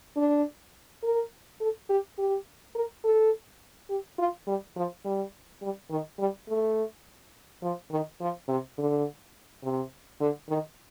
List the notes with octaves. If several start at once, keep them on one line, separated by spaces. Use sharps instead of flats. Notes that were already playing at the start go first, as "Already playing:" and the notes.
D4
A#4
A4
G4
G4
A#4
A4
G4
F4
G3
F3
G3
G3
D#3
G3
A3
F3
D#3
F3
C3
D3
C3
D3
D#3